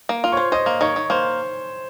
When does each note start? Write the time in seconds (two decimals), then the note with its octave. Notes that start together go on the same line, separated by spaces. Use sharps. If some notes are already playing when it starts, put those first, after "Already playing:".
0.09 A#3
0.24 F4
0.32 C#5 C#6
0.37 C5
0.52 C5 D#5 D#6
0.66 A#3
0.81 D#3 C#5 C#6
0.96 D#3
1.10 A#3 C5 C6